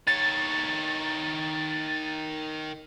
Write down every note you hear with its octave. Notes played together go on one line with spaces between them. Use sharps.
D#3 C#5 A6